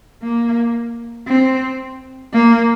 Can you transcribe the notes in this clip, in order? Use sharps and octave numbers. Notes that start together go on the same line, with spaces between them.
A#3
C4
A#3